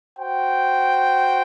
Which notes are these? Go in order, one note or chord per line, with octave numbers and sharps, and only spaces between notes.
F#4 C5 G5